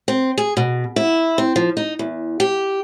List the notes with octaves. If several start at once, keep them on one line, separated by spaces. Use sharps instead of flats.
C4
G#4
B2
E4
C4
F3
D#4
E2
G4